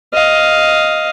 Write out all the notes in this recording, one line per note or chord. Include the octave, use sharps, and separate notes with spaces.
D#5 F5